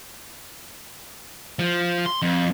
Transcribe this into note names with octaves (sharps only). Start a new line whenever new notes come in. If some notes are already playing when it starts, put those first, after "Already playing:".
F3
C6
F2